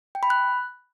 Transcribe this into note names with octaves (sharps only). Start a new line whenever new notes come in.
G5
B5
F#6